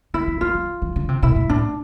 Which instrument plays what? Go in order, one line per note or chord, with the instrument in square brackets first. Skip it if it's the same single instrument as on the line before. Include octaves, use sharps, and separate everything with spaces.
[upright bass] D3 [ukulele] E4
[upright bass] E3
[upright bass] F3 [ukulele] F4
[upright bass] F3
E3
D3
C3
[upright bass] B2 [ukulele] E4
[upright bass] A2
[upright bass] A2 [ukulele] D4